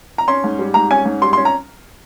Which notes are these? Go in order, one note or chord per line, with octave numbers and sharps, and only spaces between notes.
A#5
C#4 C6
G#2
G3
G#2 A#5
C#4 G#5
G#2
G3 C6
C6
C#4
A#5